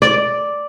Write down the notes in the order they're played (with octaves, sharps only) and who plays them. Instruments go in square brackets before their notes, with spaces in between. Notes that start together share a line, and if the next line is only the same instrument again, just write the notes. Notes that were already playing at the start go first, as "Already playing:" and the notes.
[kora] D5